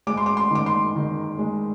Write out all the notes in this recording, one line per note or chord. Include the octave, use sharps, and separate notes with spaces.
G#3 D6
C6
D6
C6
D#3 D6
C6
D#3
G#3